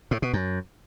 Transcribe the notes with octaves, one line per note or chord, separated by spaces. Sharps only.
A2
B2
F#2